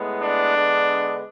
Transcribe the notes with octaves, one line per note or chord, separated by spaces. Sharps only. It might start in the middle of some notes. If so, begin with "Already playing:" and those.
Already playing: A2 G#3 B3
D4
D3 G#3 B3